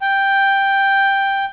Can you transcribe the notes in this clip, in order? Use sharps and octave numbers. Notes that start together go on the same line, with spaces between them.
G5